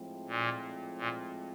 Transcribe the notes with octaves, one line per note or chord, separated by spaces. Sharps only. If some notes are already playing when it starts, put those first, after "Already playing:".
Already playing: A2 F3 G#3 C4
A#2
A#2